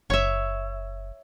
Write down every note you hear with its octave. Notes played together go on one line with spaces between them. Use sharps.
F#1 C#5 E5